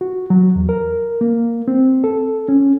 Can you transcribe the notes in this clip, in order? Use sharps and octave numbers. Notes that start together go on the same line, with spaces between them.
F#4
F#3
E2
A#4
A#3
C4
A4
C#4